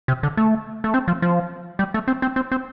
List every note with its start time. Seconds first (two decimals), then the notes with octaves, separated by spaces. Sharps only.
0.08 C3
0.23 D3
0.37 A3
0.84 A3
0.94 C4
1.08 F3
1.22 F3
1.79 G3
1.94 A3
2.08 C4
2.22 C4
2.36 C4
2.52 C4